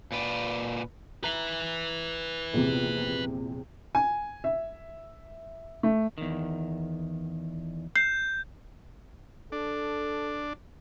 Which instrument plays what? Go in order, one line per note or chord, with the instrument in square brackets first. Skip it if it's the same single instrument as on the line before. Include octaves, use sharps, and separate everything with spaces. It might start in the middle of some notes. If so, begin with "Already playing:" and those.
[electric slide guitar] A#2 B4 D5
[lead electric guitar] B4 E5 [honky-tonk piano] A#5
[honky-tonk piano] A#1 E2 C3
[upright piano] G#5
E5
A3
[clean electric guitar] E2 D#3
[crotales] G6 [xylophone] C7
[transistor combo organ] D4 [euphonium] A4